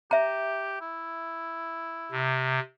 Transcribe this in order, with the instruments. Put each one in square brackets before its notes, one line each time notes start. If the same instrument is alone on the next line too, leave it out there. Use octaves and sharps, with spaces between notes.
[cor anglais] G4 [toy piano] E5 A#5
[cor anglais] E4
[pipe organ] C3